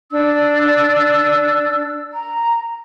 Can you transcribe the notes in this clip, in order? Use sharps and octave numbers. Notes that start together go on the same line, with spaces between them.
D4 E6
A#5